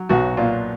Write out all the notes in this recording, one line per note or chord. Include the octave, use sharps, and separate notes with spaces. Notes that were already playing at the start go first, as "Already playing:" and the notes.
Already playing: F#3
B1 F#4
A#2 F4